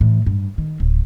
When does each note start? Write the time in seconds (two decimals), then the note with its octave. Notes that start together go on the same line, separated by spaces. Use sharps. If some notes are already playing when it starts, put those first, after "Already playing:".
0.01 A2 E3
0.26 G2
0.58 D#3
0.80 D1